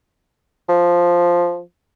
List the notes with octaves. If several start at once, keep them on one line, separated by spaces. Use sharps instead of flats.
F3